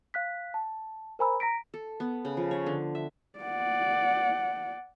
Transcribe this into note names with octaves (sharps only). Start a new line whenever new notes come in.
F5 F#6 B6
A5
A#4 C5 G#5 A#5 B5 E6
A#5 A#6 B6 D7
A4
B3
C#3
F3
C#5
D3
E5
D5 F#5